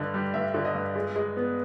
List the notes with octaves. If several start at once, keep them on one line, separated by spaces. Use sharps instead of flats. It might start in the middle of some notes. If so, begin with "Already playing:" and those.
Already playing: G2 D3 D#5
G3
G2 E5
D3
D#5
G2
G#3
G#3
B3